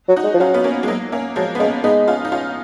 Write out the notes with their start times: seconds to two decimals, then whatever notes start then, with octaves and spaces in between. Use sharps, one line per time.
0.08 F#3
0.16 D#4 F#4
0.24 G#3
0.34 F3
0.40 F#3 C#4 F4
0.54 B3
0.64 A#3 C#4
0.83 G#3
0.88 F#3 A#3
1.12 A#3 C#4
1.36 F3 F#3 G#3
1.55 B3
1.60 G#3 A#3 C#4
1.84 G#3 B3 D#4
2.08 C#4 F4
2.25 D#4
2.32 C#4 F4